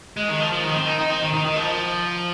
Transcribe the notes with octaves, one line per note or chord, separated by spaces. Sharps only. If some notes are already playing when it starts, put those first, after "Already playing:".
G#3
D#3
F3
F3
D#3
C4
D#4
D#4
C4
D#3
D#3
D#3
F3